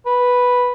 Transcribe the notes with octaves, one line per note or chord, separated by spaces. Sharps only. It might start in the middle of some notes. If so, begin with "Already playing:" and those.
B4